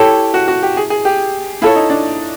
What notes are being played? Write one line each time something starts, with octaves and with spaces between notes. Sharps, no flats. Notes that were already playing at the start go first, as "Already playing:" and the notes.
Already playing: E4 G4 A4 C#5
F#4
F#4
G4
G#4
G#4
G4
E4 F4 A4 C#5
D#4
D4